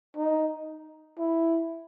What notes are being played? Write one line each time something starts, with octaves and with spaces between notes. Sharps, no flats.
D#4
E4